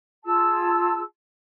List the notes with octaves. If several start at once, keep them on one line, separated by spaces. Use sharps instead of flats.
F4 G#4 A5 E6